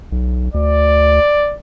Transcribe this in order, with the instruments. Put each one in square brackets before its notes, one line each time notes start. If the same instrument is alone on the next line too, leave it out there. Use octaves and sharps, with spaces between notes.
[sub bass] B1
[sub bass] D2 [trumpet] D5